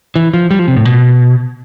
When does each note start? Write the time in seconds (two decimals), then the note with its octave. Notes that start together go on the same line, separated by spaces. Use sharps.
0.16 E3
0.34 F3
0.51 G3
0.59 F3
0.68 C3
0.77 A2
0.85 B2